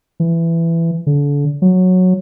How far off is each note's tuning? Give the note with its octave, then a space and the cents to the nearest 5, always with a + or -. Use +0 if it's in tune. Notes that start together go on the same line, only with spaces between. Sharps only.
E3 +15
D3 -35
F#3 -10